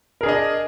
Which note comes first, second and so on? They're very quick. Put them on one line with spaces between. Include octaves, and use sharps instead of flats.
A#4 G#4 D4 D#5